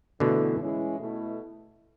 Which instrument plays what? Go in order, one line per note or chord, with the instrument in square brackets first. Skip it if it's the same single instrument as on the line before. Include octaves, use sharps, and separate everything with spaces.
[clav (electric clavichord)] B2 D3 [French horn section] E3 A3 E4
[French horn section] E3 G#3 C#4 E4
B2 A3 E4